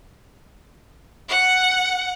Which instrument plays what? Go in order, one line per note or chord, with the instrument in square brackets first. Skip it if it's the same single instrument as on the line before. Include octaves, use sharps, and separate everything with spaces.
[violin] F#5